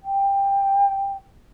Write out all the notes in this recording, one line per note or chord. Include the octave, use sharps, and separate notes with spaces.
G5